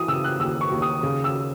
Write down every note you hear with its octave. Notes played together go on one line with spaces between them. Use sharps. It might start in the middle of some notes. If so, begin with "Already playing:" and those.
Already playing: E3 D#6
C#3 E6
F#6
D#2 E6
C#6
D#2
D#6
C#3
E6